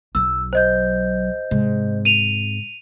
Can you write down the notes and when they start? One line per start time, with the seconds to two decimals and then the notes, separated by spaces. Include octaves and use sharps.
0.15 B1 F#3 E6
0.53 C5 D#5 G6
1.51 G#2 C3
2.05 D#7 F7